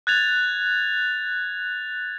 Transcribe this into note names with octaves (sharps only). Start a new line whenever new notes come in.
F#6 G#6 A6 F7